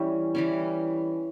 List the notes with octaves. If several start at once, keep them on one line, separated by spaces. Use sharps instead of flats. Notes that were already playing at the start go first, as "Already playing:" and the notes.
Already playing: E3 G3 C#4
E3 G3 C#4